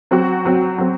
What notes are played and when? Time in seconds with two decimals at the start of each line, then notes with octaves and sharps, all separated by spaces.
0.11 F#3 C4 F#4
0.45 F#3 C4 F#4
0.78 F#3 C4